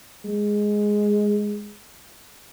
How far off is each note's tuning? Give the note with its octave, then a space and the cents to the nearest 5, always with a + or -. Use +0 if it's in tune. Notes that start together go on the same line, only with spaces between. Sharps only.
G#3 +0